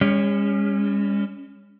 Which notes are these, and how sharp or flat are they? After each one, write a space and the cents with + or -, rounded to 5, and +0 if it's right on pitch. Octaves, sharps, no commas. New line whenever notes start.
G#3 -45 C#4 +0